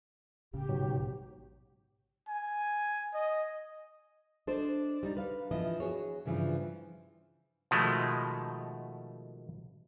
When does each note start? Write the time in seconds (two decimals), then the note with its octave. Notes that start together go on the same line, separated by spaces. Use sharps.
0.53 A1 C#3 G4
0.69 G#2 B2 F#3
2.28 G#5
3.14 D#5
4.47 D4 A4 C5 D5 D#5
5.03 G3 D#4
5.17 B4 F5
5.51 E3 F3 B3 E4 D#5
5.80 F#4 G#4 C#5
6.25 G2 C#3 E3 F3
7.71 B2 D#3 F3 G#3 A3